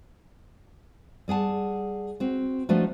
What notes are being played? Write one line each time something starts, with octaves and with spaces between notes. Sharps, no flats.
G3 G#4 F#5 A5
C4 F#4
F3 A3 D4 D#4 F#4